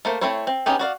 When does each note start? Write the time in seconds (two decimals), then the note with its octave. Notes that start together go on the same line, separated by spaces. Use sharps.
0.05 A3 A#3 C5
0.21 A3 C4 E4 C5 C#5
0.47 C4
0.66 B3 C#4 D#4 G4 G#4
0.79 F#4 D5 F5